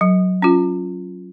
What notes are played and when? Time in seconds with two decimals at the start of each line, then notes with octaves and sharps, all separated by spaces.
0.01 F#3
0.42 C#4 F4